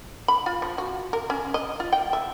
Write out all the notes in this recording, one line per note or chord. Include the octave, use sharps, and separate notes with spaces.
B5
F4
F3
F#4
A#4
C#4
D#5
F4
G5
E5